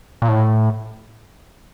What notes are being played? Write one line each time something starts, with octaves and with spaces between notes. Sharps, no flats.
A#2
A2